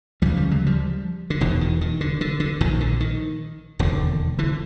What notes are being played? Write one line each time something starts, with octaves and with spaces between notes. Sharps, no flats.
D2 C#3 F3 G3
F3 G3
F#3 G#3
F3 G3
D3
E1 E2 B2 D#3
D#3
D#3
D3
D3
D3
A#1 A#2 D#3
D3
D#3
E1 D#2 D3 D#3
D3 E3